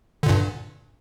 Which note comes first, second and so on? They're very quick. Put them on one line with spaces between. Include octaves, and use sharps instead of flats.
D3 A#2 G2